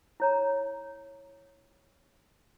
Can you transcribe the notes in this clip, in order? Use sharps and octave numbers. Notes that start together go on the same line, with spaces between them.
E4 C#5 A#5